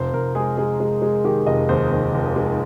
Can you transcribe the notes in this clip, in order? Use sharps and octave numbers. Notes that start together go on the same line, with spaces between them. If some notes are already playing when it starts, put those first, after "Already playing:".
Already playing: F1 C5
F1 A#4
G#3 G#4
G#3 G#4
G#3
G#3
D#3 G4
F1 D#5
D#2 C5
D#2
F1
G#3